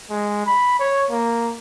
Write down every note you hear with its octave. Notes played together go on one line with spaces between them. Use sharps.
G#3
B5
C#5
A#3